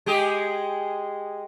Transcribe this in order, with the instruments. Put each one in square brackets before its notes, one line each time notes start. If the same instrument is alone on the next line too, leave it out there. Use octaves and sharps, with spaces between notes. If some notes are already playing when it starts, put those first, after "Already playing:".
[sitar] G#3 G4 G#4